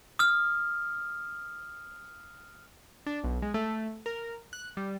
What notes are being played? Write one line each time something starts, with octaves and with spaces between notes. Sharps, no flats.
D#6 F6
D4
B1
G#3
A3
A#4
F#6
G3